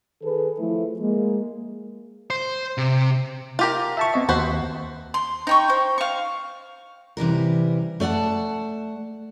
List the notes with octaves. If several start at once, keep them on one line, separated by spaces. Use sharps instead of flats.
D#3 G#4 A4 B4
F3 A3 E4
G#3 A#3
C5
C3
F4 G4 A#4
E5 A5 C#6
B3 C4 D#5
D#2 F#4 B4 C5
C6
D#4 G5 C#6
C5
F5 C#6
C3 E3 G3 A#4
A3 D5 D#5 F#5 A5